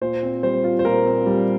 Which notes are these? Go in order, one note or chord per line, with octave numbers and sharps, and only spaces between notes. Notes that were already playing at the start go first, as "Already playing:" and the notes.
A#2 C5
C4
G3 C5
F4
C5
A#2 A#4
C4
G3